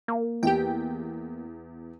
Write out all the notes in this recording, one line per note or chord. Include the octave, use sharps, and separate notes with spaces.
A#3
E2 G4 G5